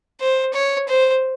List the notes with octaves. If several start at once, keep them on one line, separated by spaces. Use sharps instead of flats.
C5
C#5
C5